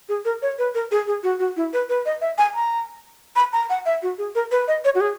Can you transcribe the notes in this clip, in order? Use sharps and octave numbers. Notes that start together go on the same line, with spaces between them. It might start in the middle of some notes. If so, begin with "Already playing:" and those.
G#4
A#4
C#5
B4
A#4
G#4
G#4
F#4
F#4
E4
B4
B4
D#5
E5
G#5
A#5
B5
A#5
F#5
E5
F#4
G#4
A#4
B4
D#5
C#5
F#4
G#4